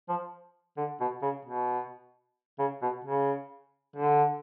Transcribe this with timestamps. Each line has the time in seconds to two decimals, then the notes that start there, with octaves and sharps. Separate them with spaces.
0.09 F3
0.77 D3
1.00 B2
1.22 C#3
1.45 B2
2.59 C#3
2.82 B2
3.05 C#3
3.96 D3